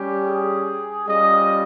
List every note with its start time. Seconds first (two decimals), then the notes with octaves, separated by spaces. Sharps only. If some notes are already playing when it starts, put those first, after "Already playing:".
Already playing: G3 C#4 G4
0.25 G#4
1.07 G3 C#4 F4 D#5